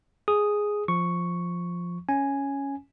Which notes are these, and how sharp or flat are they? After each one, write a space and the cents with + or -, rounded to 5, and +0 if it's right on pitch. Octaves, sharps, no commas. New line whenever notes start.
G#4 +0 D#6 +0
F3 +0 C#6 +0
C#4 +0 G#5 +0